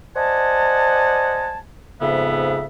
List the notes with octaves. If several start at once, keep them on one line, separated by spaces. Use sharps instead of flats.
C5 D5 D#5 F#5 G#5 A5
F2 G#2 C#3 B3 E5